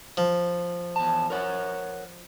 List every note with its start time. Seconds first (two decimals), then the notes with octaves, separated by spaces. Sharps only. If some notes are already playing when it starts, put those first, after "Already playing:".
0.17 F3
0.96 E2 A5
1.30 A#4 C#5 F#5